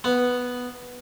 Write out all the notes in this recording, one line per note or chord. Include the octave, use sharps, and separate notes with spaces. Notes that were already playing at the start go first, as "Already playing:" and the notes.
B3